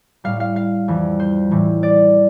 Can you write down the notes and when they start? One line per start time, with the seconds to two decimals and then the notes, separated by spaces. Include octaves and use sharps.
0.24 A2 G3 F5
0.40 F5
0.56 F5
0.88 F2 E3 G3
1.20 C5
1.51 A2 E3 G3
1.83 D5